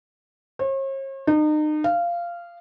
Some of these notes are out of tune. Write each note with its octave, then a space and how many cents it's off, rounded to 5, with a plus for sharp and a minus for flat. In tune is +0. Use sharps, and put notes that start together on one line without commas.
C#5 -45
D#4 -35
F5 -15